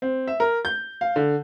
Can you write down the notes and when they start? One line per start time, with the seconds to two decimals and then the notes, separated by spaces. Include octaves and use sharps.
0.02 C4
0.27 E5
0.40 A#4
0.65 G6
1.01 F5
1.16 D3